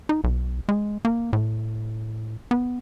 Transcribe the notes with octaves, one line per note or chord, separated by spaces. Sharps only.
D#4
B1
G#3
A#3
A2
B3